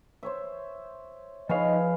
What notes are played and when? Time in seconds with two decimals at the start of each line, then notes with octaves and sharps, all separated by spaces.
0.23 C5 C#5 E5
1.49 F3 D#4 G#4 B4 C#5 D#5 F5